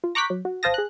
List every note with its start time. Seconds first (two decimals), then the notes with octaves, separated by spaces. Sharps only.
0.04 F4
0.15 A#5 C#6 D6 F#6 G6 B6
0.30 F#3
0.45 F#4
0.63 A1 C5 F5 A5 D#6 A#6
0.74 G#4 F#6